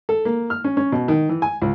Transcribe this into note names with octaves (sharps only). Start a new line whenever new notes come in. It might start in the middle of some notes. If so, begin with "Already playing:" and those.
A4
A#3
F6
C#4
C#4
B2
D#3
E3
G#5
C#2